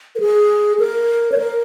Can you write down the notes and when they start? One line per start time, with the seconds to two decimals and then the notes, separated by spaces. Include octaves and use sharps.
0.15 A#4
0.20 G#4
0.79 A#4
1.32 C#5
1.38 A#4